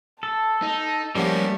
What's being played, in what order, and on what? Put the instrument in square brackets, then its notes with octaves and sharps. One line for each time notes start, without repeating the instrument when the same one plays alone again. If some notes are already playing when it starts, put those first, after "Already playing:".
[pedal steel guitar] A4 [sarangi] A5
[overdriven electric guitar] D#4
[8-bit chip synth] F3 G4 F#5 [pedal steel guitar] G3 A3 [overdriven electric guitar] A#3 C#4